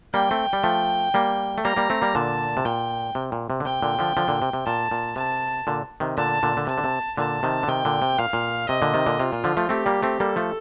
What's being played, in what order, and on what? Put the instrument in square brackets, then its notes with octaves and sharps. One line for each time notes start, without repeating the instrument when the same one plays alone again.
[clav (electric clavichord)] G3 A#3 [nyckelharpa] G5
[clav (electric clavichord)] A3 C4
G3
F3 A3
G3 A#3
A3
[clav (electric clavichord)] G3 A#3 [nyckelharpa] A#5
[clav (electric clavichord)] G3 A#3
A3 C4
G3 A#3
[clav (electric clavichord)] A#2 D3 [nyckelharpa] A5
[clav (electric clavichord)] C3
[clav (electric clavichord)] A#2 [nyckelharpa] G5
[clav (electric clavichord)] C3
A#2
C3
D3
[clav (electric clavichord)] C3 [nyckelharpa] G5
[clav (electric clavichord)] A#2 D3
D3 F3
D3 F3
A#2 D3
C3
C3
[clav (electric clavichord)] A#2 [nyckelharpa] A5
[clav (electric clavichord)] A#2
[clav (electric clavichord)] C3 [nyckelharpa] A5
[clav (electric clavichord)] A#2 D3
C3 D#3
[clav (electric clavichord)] A#2 D3 [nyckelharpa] A5
[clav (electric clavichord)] A#2 D3
D3
[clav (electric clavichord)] C3 [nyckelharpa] A5
[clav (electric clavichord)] D3
C3
[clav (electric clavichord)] A#2 D3 [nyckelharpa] A5
[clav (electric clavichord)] C3 D#3
D3
[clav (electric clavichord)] C3 D#3 [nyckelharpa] G5
[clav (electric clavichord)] A#2 D3
C3
[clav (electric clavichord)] A#2 [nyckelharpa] F5
[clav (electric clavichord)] A#2
[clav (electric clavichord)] C3 [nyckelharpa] D#5
[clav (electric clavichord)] A#2 D3
C3 D#3
A#2 D3
[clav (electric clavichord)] C3 [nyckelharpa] F4
[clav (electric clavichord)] A#2
D3 F3
F3 A3
[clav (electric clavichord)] A3 C4 [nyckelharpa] G4
[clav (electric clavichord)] G3 A#3
A3 C4
[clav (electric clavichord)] G3 A#3 [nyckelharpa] A4
[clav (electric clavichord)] F3 A3